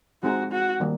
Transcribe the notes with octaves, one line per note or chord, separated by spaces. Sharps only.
G#3 C4 D#4 F#4 G#4
F#4
D#3 G3 A#3